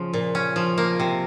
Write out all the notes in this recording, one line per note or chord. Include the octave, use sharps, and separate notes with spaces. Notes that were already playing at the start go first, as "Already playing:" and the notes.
Already playing: C#3 F3
A#2
C#4
F3
A#3
C3